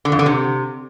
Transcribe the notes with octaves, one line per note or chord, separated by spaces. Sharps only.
D3
F2
D3
C3